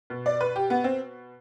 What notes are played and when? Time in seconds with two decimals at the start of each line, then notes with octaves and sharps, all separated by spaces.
0.10 B2
0.26 D5
0.41 B4
0.56 G4
0.70 B3
0.84 C4